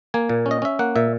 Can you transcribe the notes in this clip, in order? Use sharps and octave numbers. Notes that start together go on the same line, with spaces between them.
A#3 G#5
A#2
C#4
D#5
C#4 E5
A#3 F#5
A#2 E5